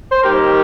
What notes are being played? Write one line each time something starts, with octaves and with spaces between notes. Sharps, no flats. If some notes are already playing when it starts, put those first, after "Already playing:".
C5
D#2 D#3 G3 G4 A#4